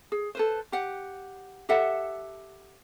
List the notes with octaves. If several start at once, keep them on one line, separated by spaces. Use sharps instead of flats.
G#4
A4 B4 C5
G4 F#5
G4 A4 E5 F#5